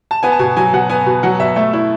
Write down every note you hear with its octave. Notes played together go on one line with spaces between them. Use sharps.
A5
B3 G#5
A5
B2 G#5
F#3 G#5
B2 F#5
B3 G#5
B2
F#3 F#5
B2 E5
A3 E5
E4